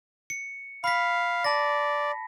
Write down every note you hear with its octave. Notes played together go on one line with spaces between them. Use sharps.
C#7
F5 B5 B6
D5 A5 A#6